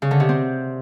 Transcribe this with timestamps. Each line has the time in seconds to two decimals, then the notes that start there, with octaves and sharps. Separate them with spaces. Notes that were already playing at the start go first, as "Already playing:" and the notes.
0.02 C#3
0.11 D3
0.20 C3
0.29 C4